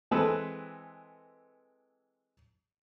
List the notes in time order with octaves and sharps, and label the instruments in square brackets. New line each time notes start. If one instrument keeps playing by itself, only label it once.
[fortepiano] E3 G#3 C4 A4 B4